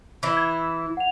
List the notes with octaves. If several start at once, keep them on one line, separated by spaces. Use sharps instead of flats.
E3 E4
G#6
F#5 F7